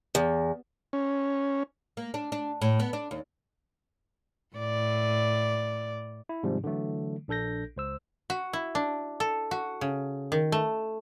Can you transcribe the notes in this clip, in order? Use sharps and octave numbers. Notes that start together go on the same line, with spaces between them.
E2
C#4
A#3
D4
D4
A2
B3
D4
D#2
A2 D5
E4
G#2 C3 D#3 F3 G3
D3 E3 F#3 A3
A#1 D4 A4 G6 A#6
C#2 C5 E6
F#4
E4
D4
A4
F#4
C#3
D#3
A3